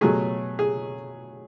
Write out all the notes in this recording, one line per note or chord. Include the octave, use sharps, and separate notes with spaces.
B2 F#3 A3 G#4
G#4